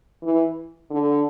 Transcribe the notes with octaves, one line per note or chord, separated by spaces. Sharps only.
E3
D3